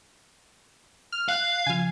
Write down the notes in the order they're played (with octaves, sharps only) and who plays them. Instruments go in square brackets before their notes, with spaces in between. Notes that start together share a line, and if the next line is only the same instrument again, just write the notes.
[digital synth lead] F6
[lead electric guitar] F5 [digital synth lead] F#6
[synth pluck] C#3 F3 [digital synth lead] G#5